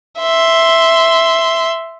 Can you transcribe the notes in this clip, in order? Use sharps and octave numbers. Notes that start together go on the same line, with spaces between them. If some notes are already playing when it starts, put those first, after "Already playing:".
E5 C6